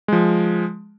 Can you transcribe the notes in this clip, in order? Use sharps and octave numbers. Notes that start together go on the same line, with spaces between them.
F3 G#3